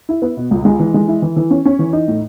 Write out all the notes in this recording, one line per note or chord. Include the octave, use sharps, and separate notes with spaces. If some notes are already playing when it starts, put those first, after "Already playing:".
E4
B3
B2
C#2
G#3
E3
G#3
E4
E3
E3
C#4
C#4
E3
D#4
A2